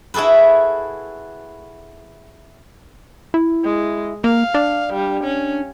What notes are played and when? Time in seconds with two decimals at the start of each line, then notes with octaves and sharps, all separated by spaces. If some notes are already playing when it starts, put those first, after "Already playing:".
0.14 E4 F#4 G#4 A4 B4
3.34 E4
3.64 G#3
4.24 A#3 F5
4.54 D4
4.93 G3
5.24 C#4